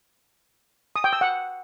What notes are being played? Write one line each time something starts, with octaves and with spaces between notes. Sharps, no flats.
D#6
G5
E6
F#5